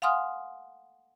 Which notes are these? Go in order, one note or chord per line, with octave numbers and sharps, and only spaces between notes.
F5 F#5 G#5 C6 D#6 F6